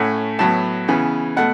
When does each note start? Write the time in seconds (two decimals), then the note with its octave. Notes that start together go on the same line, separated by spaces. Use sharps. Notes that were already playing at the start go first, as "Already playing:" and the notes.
Already playing: A2 A3 C#4 F#5
0.39 A2 F#3 B3 A5
0.88 C#3 E3 B3
1.37 B2 A3 F#5